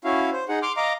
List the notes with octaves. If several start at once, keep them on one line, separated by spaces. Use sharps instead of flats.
C#4 E4 F#4 F5
C5
D#4 G#4 F#5
C6 D6 F6
D#5 F5 A#5 D6